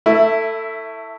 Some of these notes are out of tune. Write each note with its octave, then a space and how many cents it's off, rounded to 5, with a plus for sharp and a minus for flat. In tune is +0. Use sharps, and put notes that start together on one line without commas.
A3 +20 E4 +0